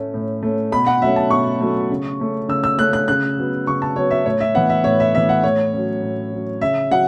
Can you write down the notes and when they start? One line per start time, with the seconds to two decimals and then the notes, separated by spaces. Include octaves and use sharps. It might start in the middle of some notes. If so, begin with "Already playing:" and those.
Already playing: A2 A3 C#4
0.14 A2
0.43 A3 C#4
0.72 B2 B5
0.87 F#5
1.02 F#3 A3 C#4 E5
1.16 A5
1.30 B2 C#6
1.60 F#3 A3 C#4
1.90 C#3
2.20 A3 C#4
2.48 C#3 E6
2.64 E6
2.79 A3 C#4 F#6
2.93 F#6
3.08 C#3 F#6
3.37 F#3 B3
3.67 C#3 C#6
3.82 A5
3.96 F#3 B3 C#5
4.11 E5
4.26 A2 C#5
4.40 E5
4.55 E3 B3 F#5
4.70 E5
4.84 A2 C#5
5.00 E5
5.14 E3 B3 E5
5.29 F#5
5.44 A2 C#5
5.73 F#3 C#4
6.02 A2
6.32 F#3 C#4
6.61 C#3 E5
6.91 F#3 F#5